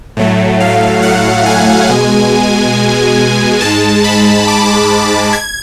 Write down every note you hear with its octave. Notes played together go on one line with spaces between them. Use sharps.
A2 F#3 A3
F5
F#5
G#5
B2 G#3
G#2 G#3 A5
B5
D6
G#6